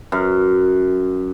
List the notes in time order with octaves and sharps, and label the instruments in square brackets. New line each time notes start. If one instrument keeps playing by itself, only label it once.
[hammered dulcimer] F#2